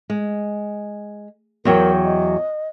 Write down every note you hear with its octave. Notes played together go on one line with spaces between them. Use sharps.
G#3
E2 F#3 A#4 G5
D#5